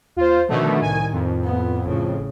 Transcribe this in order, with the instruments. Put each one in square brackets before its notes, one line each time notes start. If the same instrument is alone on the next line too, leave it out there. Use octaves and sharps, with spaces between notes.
[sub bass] D#2 [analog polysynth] F4 C5
[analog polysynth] B2 D3 A3 [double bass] D#3 [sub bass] F3
[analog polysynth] C2 G#5 [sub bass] A2
[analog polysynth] F2
[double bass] B3
[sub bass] G#1 [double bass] A2 C#3